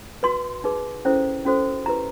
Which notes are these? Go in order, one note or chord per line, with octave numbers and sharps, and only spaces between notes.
F#4 B4 C6
D#4 G#4 B4
C#4 E4 A4 C5
C#4 F#4 A4 C5
E4 G4 B4 A#5